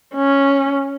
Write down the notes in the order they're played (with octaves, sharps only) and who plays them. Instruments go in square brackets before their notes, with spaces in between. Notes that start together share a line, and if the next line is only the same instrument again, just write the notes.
[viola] C#4